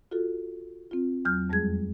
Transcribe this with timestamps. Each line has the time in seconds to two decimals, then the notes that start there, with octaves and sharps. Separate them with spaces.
0.11 F4 F#4 A4
0.91 C4 F4
1.25 E2 F#3 F6 G6
1.50 F2 G3 G#3 G#4 G#6